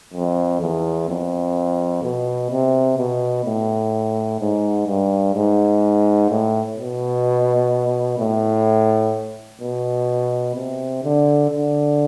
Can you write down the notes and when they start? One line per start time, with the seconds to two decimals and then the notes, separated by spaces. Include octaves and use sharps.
0.13 F2
0.61 E2
1.09 F2
2.03 B2
2.51 C3
2.97 B2
3.45 A2
4.40 G#2
4.87 G2
5.35 G#2
6.30 A2
6.76 B2
8.19 A2
9.61 B2
10.55 C3
11.03 D3
11.50 D3